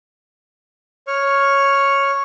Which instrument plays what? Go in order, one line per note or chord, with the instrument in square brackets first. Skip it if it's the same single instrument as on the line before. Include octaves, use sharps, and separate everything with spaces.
[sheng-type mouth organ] C#5 C#6 F6